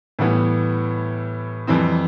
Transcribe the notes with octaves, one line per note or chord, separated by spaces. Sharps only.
A2 E3 G3 B3 E4
F2 E3 G3 C4 E4